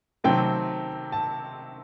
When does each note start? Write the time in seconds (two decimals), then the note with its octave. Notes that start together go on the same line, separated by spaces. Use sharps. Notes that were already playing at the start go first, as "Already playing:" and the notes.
0.24 C3 D#3 F#3 A3 C4 G5
1.12 A5